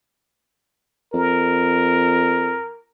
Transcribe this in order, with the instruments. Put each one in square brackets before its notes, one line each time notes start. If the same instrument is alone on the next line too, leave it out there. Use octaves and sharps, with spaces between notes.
[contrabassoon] F2 [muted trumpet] A#4